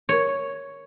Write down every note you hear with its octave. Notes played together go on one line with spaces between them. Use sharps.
C#5